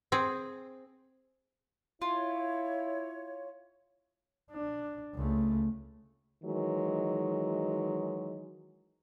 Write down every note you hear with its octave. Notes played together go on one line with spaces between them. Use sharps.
C4 G#4
E4 F4 C#5
D4
C#2 A3
D#3 E3 F#3 G#3